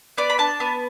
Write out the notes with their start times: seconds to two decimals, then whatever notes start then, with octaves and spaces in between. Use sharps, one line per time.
0.18 B3 D5
0.30 B5
0.38 D4 A5
0.60 B3